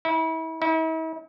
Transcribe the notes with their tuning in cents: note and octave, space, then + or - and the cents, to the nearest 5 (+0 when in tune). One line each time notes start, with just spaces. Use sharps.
E4 -35
E4 -45